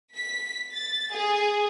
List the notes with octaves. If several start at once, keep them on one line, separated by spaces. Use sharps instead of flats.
B6
A6
G#4